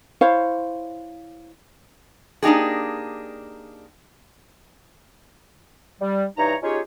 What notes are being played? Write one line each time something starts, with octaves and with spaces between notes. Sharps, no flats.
E4 C5 C#5 F5
A#3 D4 D#4 G4 G#4
G3
G2 E3 D#4 C#5 A#5
C#4 D#4 F4 G4 G#4 C#5